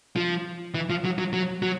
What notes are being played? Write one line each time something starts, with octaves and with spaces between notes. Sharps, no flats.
F3
E3
F3
F#3
F#3
F#3
F#3